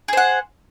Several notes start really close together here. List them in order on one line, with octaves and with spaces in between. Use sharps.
G#4 C5 F#5